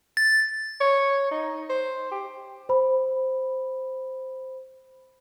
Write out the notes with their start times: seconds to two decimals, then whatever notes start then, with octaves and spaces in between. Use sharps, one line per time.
0.17 A6
0.81 C#5
1.31 D#4
1.70 C5
2.11 G4
2.69 C5 B5